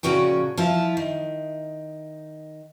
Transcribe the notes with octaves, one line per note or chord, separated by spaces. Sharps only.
A#2 C#3 F3 C#4 F#4 G5
F3 E4 F4
D#3